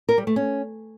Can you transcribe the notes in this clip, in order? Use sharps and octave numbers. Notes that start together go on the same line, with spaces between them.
A#4
G3
A3
C#4